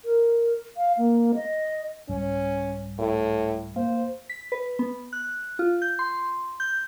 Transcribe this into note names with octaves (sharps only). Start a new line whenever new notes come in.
A#4
F5
A#3
D#5
C2 G#2 G3 C#4
A2
A#3 C5 F5
B6
B4
B3
F#6
F4
G6
C6
G6